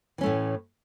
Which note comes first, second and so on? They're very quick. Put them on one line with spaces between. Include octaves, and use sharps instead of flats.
E3 C#4 A3 A2